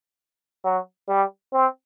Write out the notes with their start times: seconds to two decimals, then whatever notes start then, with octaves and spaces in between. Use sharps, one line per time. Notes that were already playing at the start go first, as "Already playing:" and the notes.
0.65 F#3
1.09 G3
1.53 C4